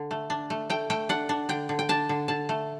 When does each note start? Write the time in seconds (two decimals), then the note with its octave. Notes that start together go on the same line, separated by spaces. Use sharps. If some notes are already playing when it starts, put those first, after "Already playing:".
Already playing: D3
0.11 A3
0.30 D4
0.50 A3
0.70 A3 G5
0.90 A3 G5
1.09 D4 F#5
1.29 D4
1.49 D3 G5
1.69 D3
1.79 G5
1.89 D4 A5
2.09 D3
2.28 D3 A5
2.49 A3